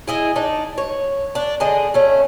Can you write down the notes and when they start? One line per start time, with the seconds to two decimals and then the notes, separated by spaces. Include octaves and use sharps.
0.07 E4 G#4 D#5
0.36 D4 D#4
0.78 C#5
1.35 D4
1.60 D3 G#4 D#5
1.94 A3 C#4